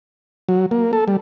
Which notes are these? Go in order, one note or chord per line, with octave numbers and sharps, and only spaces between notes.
F#3
A#3
A4
G3